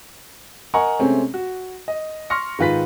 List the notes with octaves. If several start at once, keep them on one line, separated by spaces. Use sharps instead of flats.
A#4 D#5 F#5 G#5 A#5 C#6
C3 G#3 A3 C4 C#4
F#4
D#5
C6 C#6 F6 A#6 C#7
G#2 D#3 F4 B4 B6